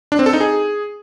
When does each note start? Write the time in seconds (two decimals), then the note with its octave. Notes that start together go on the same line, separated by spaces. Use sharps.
0.12 D4
0.19 C4
0.26 A4
0.33 D#4
0.41 G#4